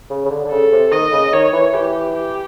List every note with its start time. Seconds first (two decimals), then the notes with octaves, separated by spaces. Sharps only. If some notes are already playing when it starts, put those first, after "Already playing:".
0.10 C#3
0.25 C#3
0.30 D3
0.45 D3
0.51 C#3 A4
0.72 C3
0.92 D#3 D#5
1.12 C#3
1.33 D#3 C#5
1.53 E3
1.74 E3 G4
2.14 G4